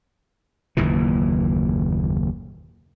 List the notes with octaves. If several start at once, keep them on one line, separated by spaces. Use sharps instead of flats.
F#1 D#2 A#2 E3